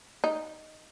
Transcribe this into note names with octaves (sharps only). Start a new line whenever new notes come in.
D#4